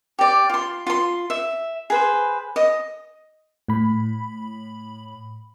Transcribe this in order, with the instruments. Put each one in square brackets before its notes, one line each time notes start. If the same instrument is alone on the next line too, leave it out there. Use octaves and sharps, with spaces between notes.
[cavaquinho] G4 D5
F4 C6
F4 C6
E5
G#4 B4 C5
D#5
[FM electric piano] A2 B5